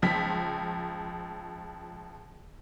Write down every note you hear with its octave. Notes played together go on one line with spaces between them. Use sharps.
C#2 F3 B6